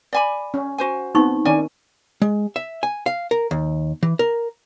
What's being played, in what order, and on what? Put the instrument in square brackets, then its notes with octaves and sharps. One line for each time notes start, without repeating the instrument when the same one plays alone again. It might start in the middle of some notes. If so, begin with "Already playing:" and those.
[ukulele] D5 G#5 B5
[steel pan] C#4
[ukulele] F#4 C5 G#5
[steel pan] B3 C4 [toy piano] D#4 C#6
[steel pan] D#3 C#4 [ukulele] E4 D5 G#5
[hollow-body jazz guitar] G#3
E5
G#5
F5
A#4
D#2
E3
A#4